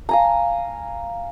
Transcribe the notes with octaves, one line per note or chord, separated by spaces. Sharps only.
F5 G#5 A#5